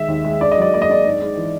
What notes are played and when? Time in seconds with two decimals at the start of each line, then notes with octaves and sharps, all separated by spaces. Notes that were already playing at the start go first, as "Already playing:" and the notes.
Already playing: D#3 G#3 E5
0.08 D#2
0.25 G#3
0.41 D4 D5
0.52 D#5
0.57 F#3 D5
0.73 A#3 D5
0.82 D#5
0.89 D4 D5
1.06 G#2
1.22 G#2
1.37 E3